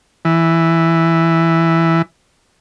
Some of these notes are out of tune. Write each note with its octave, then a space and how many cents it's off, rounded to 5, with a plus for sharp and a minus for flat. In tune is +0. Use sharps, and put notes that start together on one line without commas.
E3 +0